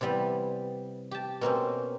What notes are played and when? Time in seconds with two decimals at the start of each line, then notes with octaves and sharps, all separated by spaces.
0.01 C3 E3 G3 B3
1.11 G4 A5
1.41 B2 A#3 C4 C#4